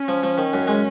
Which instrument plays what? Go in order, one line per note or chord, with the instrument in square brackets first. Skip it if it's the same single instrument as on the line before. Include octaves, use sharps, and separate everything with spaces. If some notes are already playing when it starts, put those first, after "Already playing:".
Already playing: [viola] C#4
[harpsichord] F3
F3
D#3
F#2
G#3